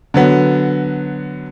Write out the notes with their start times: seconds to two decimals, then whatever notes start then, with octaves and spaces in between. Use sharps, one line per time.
0.14 D3 F#3 B3